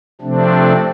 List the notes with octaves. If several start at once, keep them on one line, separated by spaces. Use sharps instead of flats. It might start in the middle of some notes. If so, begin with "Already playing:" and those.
C3 F3 A3 C4 D4